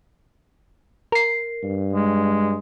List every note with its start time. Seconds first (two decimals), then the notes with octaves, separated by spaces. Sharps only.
1.12 A#4 C7
1.63 G2
1.93 G#3